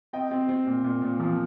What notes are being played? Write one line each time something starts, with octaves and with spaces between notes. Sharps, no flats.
C4 D#5 G5
C4
C4
A#2
A#2
A#2
F3